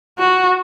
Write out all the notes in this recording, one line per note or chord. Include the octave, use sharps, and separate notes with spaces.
F#4